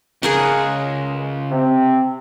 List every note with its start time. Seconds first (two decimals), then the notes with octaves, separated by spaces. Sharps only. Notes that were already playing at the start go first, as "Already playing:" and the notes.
0.23 C#2 G#4 A#4 F#5
1.51 C3 C4